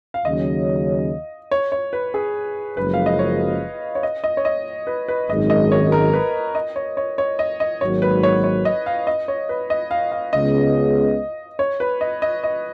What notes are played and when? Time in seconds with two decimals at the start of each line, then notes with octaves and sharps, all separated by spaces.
0.14 F5
0.25 D#2 C#3 F#3 C#4 D#5
1.51 C#5
1.72 C#5
1.93 B4
2.14 G#4
2.77 F#1 F#2 F3 G#3 B4
2.94 F5
3.06 D#5
3.19 C#5
3.95 C#5
4.03 D#5
4.24 D#5
4.37 C#5
4.45 D#5
4.87 B4
5.08 B4
5.29 G#1 F#2 D#3 G#3 D#5
5.50 D#5
5.72 C#5
5.92 A#4
6.13 B4
6.55 D#5
6.76 C#5
6.97 C#5
7.18 C#5
7.39 D#5
7.60 D#5
7.81 G#1 G#2 F#3 A#3 C#5
8.02 B4
8.23 C#5
8.44 C#5
8.65 D#5
8.86 F5
9.07 D#5
9.28 C#5
9.49 B4
9.70 D#5
9.91 F5
10.12 F5
10.33 C#2 C#3 G#3 B3 D#5
11.59 C#5
11.80 B4
12.01 D#5
12.22 D#5
12.43 D#5